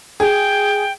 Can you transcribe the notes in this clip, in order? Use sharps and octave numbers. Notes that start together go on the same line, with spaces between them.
G#4 G5